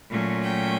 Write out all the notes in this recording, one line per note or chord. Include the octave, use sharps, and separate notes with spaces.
A#2 F#3 A3 C#4
G5